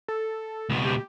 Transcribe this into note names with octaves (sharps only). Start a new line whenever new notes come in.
A4
C#2 B2
G4